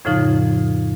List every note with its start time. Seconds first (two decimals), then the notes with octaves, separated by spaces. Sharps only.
0.05 F2 A2 C#3 F3 D#4